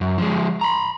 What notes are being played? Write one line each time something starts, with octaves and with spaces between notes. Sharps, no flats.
F#2
F3 G#3
A#5 B5